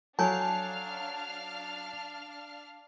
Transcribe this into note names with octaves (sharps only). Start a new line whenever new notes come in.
F#3 D4 A4 C#5 F5 G#5 A5 F6